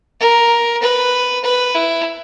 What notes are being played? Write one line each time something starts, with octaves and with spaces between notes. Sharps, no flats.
A#4
B4
B4
E4